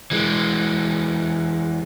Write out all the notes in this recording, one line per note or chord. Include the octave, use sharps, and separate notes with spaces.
E3 G#3